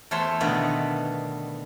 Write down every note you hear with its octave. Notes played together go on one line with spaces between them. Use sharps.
E2 A3 C5 C#5 A5 C6
B2 D3 D#3 A3 B3